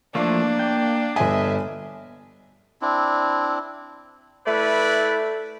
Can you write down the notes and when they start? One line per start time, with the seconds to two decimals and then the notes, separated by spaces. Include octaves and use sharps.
0.15 E3 F3 A3 A#3 D4
0.59 G5
1.16 G1 D#5 E5 G#5
2.82 C4 D4 E4
4.47 A3 E4 B4 D5